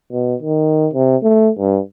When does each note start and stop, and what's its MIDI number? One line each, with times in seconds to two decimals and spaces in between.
0.12 0.35 47
0.42 0.89 51
0.94 1.17 48
1.23 1.51 57
1.59 1.80 43